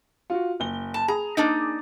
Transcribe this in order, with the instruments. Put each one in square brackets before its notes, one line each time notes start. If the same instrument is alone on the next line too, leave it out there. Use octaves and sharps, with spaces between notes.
[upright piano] F4 F#4
F#1 G7
[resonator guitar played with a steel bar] A5
[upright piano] G#4 [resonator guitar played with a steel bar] A#5
[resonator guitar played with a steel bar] A#3 D4 D#4